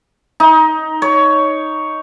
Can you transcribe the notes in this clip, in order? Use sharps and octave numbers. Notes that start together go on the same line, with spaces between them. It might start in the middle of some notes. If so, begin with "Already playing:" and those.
D#4
C#5